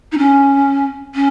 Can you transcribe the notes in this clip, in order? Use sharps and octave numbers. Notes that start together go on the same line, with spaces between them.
D#4
C#4
C#4